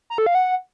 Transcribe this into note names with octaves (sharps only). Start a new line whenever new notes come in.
A#5
A4
F5
F#5